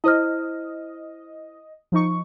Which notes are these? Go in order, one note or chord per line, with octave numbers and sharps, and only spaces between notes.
E4 C5 D#5 F6
F3 D#4 C#6